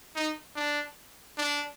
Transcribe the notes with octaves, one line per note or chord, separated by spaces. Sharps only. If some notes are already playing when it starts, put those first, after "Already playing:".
D#4
D4
D4